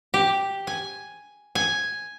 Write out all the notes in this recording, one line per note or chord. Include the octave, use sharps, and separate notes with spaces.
G4
G#5
G#5